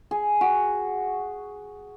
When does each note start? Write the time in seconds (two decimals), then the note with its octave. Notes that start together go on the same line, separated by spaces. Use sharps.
0.11 G#4
0.41 F#4